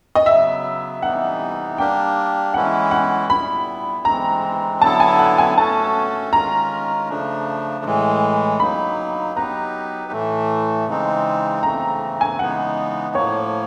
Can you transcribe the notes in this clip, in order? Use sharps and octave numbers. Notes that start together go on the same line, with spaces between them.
D#5
C#3 F#3 B3 E5
C3 E3 G3 B3 D#4 F#5
G3 A#3 D4 G4 A#4 G5
E3 G#3 C#4 E4 F#5
F#5
A#2 G3 B3 E4 B5
E3 G#3 C4 A#5
D3 F#3 B3 E4 A4 A5
G#5
F#5
G#5
A3 C#4 F#4 A4 A5
D#3 G#3 C#4 F4 A#4 A#5
C#3 F3 A3 D4
A2 E3 G#3
F#3 A#3 D#4 B5
F#3 B3 D#4 G4 B4 A#5
A2 E3 A3
C#3 E3 G#3 C4 D#4
C#3 E3 A3 C4 A#5
G#5
C#3 E3 G#3 B3 D#4 F#5
A2 F3 A#3 C#5